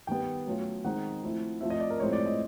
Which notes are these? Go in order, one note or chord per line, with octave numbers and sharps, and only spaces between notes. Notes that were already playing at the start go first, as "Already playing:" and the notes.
D#3 G3 B3 G5
F#3 A3 C#4 F4
D#3 G#3 C4 D#4 F#5
F3 A3 C4 E4
F3 A3 C4 F4 E5
D#5
D5
A#4
A2 F3 G#3 C4 E4 C#5
D5
D#5